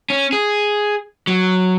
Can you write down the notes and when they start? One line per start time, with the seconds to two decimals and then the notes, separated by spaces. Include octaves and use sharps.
0.10 C#4
0.33 G#4
1.27 F#3